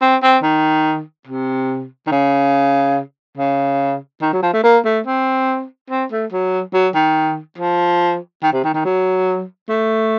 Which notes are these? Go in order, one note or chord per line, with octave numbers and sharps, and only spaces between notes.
C4
C4
D#3
C3
D#3
C#3
C#3
D#3
F#3
F3
A3
A#3
A3
C4
C4
A3
F#3
F#3
D#3
F3
D#3
C3
D#3
D#3
F#3
A3